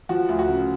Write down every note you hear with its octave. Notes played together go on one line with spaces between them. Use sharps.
F3 F#4
D2
F#4
C#3